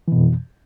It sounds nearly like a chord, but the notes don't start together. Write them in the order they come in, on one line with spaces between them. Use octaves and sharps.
E3 B2 F2